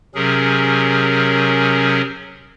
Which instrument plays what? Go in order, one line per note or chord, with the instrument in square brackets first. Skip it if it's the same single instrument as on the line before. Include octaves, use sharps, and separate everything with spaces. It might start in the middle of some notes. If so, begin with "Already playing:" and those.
[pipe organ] C3 F#3 C#4 G#4 A#4